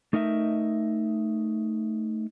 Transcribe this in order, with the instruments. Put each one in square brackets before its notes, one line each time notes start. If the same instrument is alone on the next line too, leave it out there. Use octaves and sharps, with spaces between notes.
[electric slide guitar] A3 D#4 A#4 D#5 E5